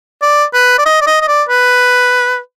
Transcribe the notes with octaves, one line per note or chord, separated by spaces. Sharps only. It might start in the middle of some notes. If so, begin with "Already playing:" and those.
D5
B4
D5
D#5
D5
D#5
D#5
D5
B4